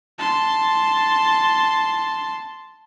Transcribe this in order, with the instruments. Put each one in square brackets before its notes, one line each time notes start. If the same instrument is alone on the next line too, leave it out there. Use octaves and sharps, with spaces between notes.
[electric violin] A5 C6